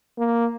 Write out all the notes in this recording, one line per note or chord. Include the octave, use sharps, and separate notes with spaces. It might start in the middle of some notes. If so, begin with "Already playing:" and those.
A#3